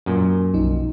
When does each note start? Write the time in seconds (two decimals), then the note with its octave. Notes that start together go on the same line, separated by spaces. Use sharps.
0.06 F#2 A#2
0.53 B1 F3 D#4